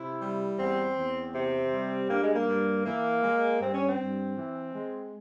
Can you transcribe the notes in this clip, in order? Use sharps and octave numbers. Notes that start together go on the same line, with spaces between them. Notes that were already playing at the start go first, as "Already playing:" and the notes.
Already playing: C3 E4
G3
E2 C4
E2
C3 C4
G3
G2 A#3
G#3
A#3
G2
E3 A#3
G#3
G2 C4
C#4
C4
G2
E3
G#3